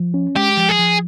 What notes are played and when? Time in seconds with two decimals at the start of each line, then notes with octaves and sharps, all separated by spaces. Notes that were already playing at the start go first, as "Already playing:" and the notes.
Already playing: F3
0.14 C#4
0.36 G#3 G4
0.57 F3
0.69 G#4
0.79 F3